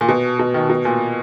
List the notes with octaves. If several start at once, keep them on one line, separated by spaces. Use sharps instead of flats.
A#2
B2
B2
D#3
B2
A#2